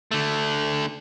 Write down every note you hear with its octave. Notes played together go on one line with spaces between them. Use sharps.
D3 A3